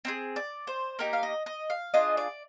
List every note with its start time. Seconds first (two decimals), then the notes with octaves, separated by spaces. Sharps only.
0.05 C4 D#4 G#4
0.36 D5
0.67 C5
0.99 A#3 D#4 G4 A#4
1.13 F5
1.23 D#5
1.46 D#5
1.70 F5
1.94 D4 F4 G#4 D#5
2.17 D5